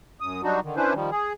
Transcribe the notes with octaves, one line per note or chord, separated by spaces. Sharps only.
F#2 D#6
F#3 G3 D4 D#4 F#4
D3 D#3
C#4 D4 E4 B4 C5
D#3 F3 G3
G#4